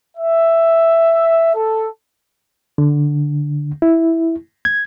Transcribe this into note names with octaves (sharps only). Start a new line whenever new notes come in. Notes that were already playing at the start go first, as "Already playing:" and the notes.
E5
A4
D3
E4
G#6